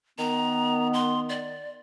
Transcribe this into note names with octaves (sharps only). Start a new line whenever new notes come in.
D#3 B3 A#5
C6
D5